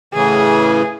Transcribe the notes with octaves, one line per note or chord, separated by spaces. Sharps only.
A2 C#3 E3 G#4